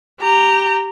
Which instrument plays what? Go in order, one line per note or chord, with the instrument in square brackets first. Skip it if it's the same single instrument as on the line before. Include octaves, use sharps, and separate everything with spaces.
[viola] G4 A#5